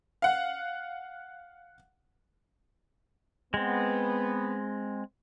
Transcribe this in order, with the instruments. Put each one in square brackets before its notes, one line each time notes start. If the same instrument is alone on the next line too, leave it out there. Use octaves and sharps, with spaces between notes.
[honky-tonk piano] F5 F#5
[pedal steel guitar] G#3 C4 [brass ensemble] B3